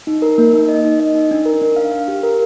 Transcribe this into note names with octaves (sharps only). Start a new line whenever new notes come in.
D#4
A#4
A#3
D#4
D#5
D#4
D#5
D#4
D4
A#4
D4
F5
F5
G4
A#4